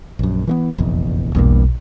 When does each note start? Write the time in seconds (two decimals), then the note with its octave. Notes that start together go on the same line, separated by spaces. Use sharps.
0.19 A#1 F#2
0.47 E3 A3 B3
0.78 F1 A#1 E2
1.35 E1 B1 E2 G2 A#3